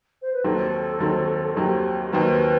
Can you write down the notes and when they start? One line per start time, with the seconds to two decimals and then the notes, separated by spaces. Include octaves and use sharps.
0.22 C5
0.33 B4
0.44 D#2 D#3 F#3 C4 A4
1.00 D#2 D#3 F#3 C4
1.57 D#2 D#3 F#3 C4 G4
2.12 D#2 D#3 F#3 C4 B4